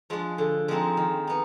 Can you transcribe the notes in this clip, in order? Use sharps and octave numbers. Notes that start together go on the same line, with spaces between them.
F3 G#3 D4
D3
F3 G#3 C4 D#4
D#3
B3 D#4